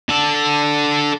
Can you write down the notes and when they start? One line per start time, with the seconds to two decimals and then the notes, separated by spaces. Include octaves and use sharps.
0.09 D4 A4